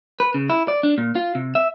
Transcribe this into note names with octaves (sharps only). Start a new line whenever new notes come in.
B4
C#3
E4
D5
D4
A#2
F4
C3
E5